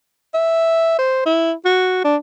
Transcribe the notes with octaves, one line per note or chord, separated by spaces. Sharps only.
E5
C5
E4
F#4
D4